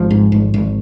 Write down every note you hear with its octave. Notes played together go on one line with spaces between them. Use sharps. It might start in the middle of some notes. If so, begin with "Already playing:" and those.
Already playing: G#1 F3
G#2
G#1
G#1